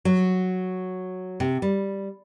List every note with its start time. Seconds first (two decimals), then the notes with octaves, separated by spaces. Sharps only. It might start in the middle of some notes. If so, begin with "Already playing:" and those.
0.05 F#3
1.40 C3
1.62 G3